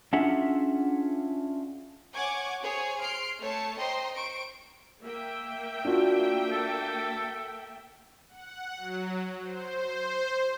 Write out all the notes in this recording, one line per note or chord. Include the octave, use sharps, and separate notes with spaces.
C#4 D4 F4 G#4 E5 F#5
C#5 F#5 G#5 C#6 D6 G#6
G#4 C5 C#5 G#5
C6 F6 C7 D7
A3 C#5 A5 C#7
C5 D#5 G5 A#5 C6
C5 C#6 D7
A#3 E5 G5
D4 F4 F#4
A4
F#5
F#3
C5